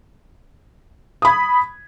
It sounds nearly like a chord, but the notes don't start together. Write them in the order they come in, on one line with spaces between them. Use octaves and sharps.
D#6 B5 G#6